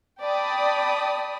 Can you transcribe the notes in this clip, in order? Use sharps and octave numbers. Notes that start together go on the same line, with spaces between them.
D5 G5 A5 B5 D#6